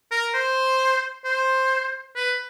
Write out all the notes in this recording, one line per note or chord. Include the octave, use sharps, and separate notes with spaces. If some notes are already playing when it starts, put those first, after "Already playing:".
A#4
C5
C5
B4